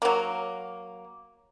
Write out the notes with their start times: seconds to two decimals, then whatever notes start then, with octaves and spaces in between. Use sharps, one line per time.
0.02 F#3 A#3